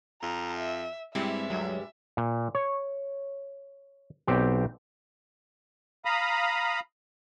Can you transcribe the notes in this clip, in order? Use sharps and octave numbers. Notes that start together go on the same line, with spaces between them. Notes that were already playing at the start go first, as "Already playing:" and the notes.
F2 A#5
E5
G2 G3 G#3 C4 E4 E5
D2 F#3
A#2
C#5
B1 C4 G4
F5 A#5 B5 D#6